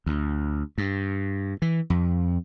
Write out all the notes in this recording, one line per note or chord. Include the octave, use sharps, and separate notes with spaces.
D2
G2
E3
F2